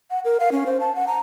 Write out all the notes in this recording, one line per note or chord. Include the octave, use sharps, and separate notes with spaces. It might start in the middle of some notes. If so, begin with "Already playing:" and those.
F#5
A#4
F5
C#4
C5
A5
F#5
A#5